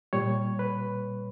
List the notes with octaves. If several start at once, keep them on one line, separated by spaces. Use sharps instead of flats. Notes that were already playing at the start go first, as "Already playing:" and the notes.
A#2 G3 C#5
B4